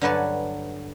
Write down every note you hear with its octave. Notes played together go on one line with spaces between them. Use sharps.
G2 D3 F#3 B4 G#5 A5